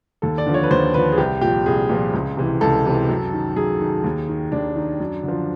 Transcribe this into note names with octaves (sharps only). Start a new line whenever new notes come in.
D#2 A4
D5
D3 F3
C#5
B4
D#2 C5
D3 F3 B4
G#4
C2 G4
A#2 F3 G4
C2 G#4
A#2 F3
C#2
C3 E3
C#2 A4
C3 E3
F#2
D#3
F#2 G#4
D#3
D#2
D#3
D#2 D4
D#3
F#2
D3
F3